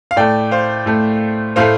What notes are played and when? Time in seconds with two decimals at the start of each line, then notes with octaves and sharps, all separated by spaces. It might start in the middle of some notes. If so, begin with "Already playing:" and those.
0.11 F5
0.16 A2 A3 D5 G5
0.51 C5 F5
0.86 A2 A3
1.56 A2 A3 C5 F5